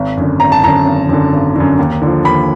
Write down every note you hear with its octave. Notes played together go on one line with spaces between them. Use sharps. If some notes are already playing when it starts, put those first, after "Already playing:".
Already playing: G#1
F#2 D3
G#1 A#5
A5
F#2 D3 A#5
G#1
F#2 D3
G#1
F#2 D3
D#2
D3 F3
D#2 B5